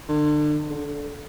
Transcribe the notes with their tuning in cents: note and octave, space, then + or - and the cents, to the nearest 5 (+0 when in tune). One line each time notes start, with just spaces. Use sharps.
D3 +35
D3 -20